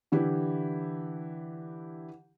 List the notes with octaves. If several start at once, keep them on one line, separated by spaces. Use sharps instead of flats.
D3 E3 E4 G4